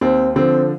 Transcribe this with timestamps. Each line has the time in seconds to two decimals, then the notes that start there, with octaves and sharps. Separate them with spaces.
0.01 D#2 C4
0.36 D3 F3 C4